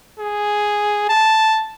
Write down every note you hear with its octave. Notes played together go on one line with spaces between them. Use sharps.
G#4
A5